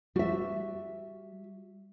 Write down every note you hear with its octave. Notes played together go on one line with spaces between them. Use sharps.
G3 F#4 E5